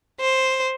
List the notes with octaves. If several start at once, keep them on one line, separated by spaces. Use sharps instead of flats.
C5